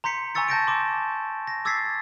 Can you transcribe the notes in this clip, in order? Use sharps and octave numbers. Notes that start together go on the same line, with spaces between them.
A#5 C6 G6 B6 C#7
G#5 A#5 C#6 E6 A6 C#7
A5 G6 A#6 D7
C6 D6 E7
A#6
D6 E6 G#6 A6 B6 C7